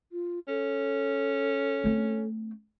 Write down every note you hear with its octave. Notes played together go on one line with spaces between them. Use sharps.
F4
C#4 A4
A3 C4